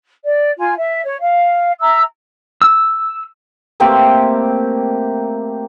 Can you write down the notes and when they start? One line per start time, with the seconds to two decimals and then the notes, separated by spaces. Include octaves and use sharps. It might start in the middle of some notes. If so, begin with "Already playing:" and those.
0.24 D5
0.58 F4 G#5
0.76 E5
1.03 C#5
1.19 F5
1.80 E5 A#5 E6
2.62 E6
3.80 A3 A#3 C4 G4